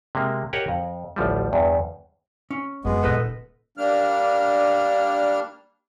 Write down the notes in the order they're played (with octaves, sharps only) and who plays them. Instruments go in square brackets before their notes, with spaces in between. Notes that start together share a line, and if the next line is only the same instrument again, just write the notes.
[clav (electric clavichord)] C3 G#3 A#3
G4 A#4 C#5 D#5 F#5
F2
A1 D2 F3 G3
E2 G2
[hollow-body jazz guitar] C#4
[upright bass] F#2 F#3 [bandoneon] G#3 B3
[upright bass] D#1 A#2 [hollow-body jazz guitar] A4 B4 D#5
[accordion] G3 A#3 D4 F6